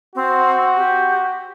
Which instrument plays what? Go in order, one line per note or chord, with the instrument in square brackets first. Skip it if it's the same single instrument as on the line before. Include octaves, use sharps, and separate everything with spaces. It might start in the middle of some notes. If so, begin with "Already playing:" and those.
[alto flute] C4 [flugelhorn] F#4
[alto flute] G4